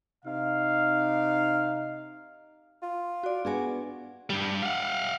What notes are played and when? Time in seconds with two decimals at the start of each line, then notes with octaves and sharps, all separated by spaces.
0.25 C3 D#4 F5
2.82 F4
3.23 F#4 D5
3.45 B3 D4 F#4 G#4 G#5
4.30 G2 G3
4.62 F5 F#5